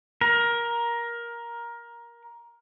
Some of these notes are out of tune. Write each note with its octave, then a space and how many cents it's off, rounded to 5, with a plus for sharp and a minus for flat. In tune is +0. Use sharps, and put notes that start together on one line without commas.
A#4 +15